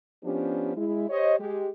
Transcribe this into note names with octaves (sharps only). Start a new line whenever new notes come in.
F3 B3 C#4 D4 G4
G#3 E4
G4 C5 C#5 D#5
G#3 G4